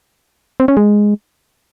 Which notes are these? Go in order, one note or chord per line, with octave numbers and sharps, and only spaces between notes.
C4
C#4
G#3